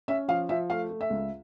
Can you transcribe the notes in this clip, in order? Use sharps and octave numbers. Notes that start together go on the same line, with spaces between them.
C#4 E5
F3 F5
F3 E5
A3 F5
A3
E5
C#2